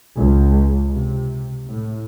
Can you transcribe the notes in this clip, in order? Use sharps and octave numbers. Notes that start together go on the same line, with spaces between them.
C#2
C3
A2